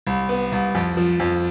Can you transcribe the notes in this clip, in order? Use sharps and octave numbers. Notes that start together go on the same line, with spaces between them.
C2
B3
C2
F2
F3
F2